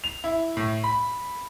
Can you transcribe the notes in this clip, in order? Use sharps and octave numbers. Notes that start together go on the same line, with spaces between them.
F7
E4
A2
B5